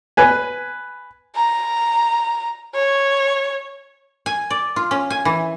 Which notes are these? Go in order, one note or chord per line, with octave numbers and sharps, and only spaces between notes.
B4 G#5
A#5
C#5
G#5
D5
F4
C#4
G#5
E3